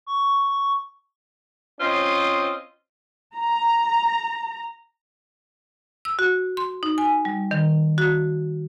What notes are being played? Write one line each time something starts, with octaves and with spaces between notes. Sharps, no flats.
C#6
C4 C#4 F4 C5 D#5
A#5
E6
F#4
C6
D#4
G#5
G3
D#3
F#4